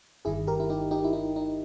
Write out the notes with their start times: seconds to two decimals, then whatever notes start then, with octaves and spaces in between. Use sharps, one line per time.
0.25 G1 G2 D#3 E4 G#4
0.47 G4 A#4
0.60 E4
0.70 D#4 G4
0.91 D#4 G4
1.04 E4
1.13 D#4
1.36 D#4